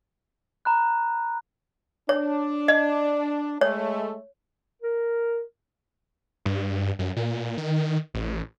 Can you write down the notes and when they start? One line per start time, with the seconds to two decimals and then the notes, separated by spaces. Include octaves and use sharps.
0.65 A#5 B5 F#6
2.09 D4 C#5
2.68 D#5
3.61 G#3 A3 C#5
4.82 A#4
6.46 G2
6.99 F#2
7.16 A#2
7.58 D#3
8.14 A1